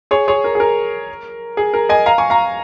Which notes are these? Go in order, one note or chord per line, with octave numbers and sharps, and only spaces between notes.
G#4 C#5
G#4 C#5
A#4
G#4
A#4
G#4
A#4
D#5 G#5
F5 A#5
G#5 C#6
F5 A#5